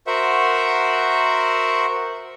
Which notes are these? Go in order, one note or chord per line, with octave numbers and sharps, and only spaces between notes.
F#4 A#4 C5 E5 F#5